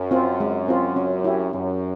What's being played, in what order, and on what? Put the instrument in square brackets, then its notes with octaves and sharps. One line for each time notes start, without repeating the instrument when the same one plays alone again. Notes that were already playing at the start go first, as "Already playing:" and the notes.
Already playing: [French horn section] F#2
[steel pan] C4 F4
G#3
C4 F4
C#4
E4 G4
[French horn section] F#2 [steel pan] C#4